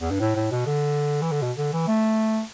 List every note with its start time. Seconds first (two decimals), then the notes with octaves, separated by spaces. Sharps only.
0.01 E2
0.11 G2
0.20 A2
0.35 A2
0.51 B2
0.66 D3
1.22 E3
1.31 D3
1.42 B2
1.57 D3
1.73 E3
1.87 A3